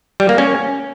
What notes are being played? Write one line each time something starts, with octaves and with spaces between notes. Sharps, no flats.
G3
A#3
C#4